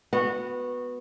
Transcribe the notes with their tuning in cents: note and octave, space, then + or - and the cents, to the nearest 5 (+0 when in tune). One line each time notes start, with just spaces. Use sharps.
B3 +0 F#4 -15